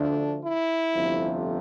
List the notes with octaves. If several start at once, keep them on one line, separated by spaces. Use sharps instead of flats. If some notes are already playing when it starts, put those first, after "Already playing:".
Already playing: D2 D3 F3 A3 D4
E4
G1 F2 C3 F3 A3